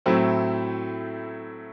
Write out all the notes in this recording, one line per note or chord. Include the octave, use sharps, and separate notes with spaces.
A2 F#3 A3 C4 E4